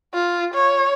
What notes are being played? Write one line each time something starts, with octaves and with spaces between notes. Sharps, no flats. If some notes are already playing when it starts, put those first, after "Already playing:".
F4
C#5